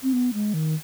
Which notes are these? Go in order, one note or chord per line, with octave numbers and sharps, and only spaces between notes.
C4
B3
G#3
D#3